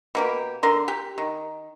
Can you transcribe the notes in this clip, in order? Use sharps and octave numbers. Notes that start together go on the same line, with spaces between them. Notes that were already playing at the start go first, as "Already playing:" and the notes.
B2 A#3 G4
D3 A#4 C6
G4
D#3